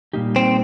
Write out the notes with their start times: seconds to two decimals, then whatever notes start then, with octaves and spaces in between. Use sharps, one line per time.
0.13 A#2 G3 A#3 D#4 G4
0.36 C4